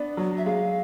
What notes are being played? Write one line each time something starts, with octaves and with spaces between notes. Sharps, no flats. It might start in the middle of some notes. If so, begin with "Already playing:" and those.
Already playing: B3 D4
F#3
E5
G#3 F5